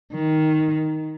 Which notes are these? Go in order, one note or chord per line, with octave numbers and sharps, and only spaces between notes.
D#3